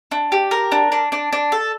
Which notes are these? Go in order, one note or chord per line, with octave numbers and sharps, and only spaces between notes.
D4
G4
A#4
D4
D4
D4
D4
A4